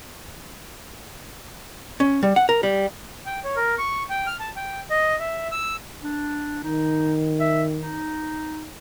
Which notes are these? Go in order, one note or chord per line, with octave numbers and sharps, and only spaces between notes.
C#4
G3
F#5
A#4
G3
G5
C#5
A#4
C#6
G5
F6
A5
G5
D#5
E5
E6
D4
D#3 D#4
E5
D#4